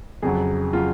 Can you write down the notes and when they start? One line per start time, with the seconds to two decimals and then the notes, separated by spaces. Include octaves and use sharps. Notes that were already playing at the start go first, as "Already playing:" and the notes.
0.22 F2 C#3 F#3 G#4
0.73 C#3 F#3 F4